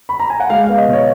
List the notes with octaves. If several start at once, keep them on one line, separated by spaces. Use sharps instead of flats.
B5
A#5
G#5
F#5
G#3 F5
F5
B3
D#5
B2
C#5